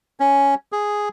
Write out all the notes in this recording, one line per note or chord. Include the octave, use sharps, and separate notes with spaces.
C#4
G#4